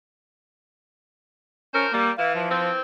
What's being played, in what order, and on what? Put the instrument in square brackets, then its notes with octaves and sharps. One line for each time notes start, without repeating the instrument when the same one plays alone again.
[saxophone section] F3 A#4 C5 [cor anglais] C#4
[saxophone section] G3 [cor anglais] A#3
[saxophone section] E3 [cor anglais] F5
[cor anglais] F3
[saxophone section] E3 C4